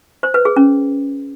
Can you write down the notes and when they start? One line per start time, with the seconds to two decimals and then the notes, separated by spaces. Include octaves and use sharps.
0.23 C5
0.34 B4
0.45 G#4
0.56 C#4